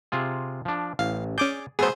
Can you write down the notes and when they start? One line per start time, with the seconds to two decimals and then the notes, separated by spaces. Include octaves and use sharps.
0.12 C3 F4 G#4
0.65 F3 D4
0.99 A1 F5
1.38 C#4 G#4 D5 D6 G6
1.79 F#3 A3 B3 G#4 C5